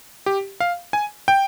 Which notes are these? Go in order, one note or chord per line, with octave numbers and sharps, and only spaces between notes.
G4
F5
G#5
G5